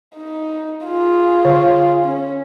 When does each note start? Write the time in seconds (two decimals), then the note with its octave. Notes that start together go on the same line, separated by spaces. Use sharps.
0.16 D#4
0.86 F4 G#4
1.45 D3
2.05 C#4